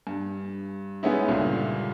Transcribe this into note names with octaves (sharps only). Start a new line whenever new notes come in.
G2
G#3 B3 C#4 D#4 E4
C#2 G2 A#2 D3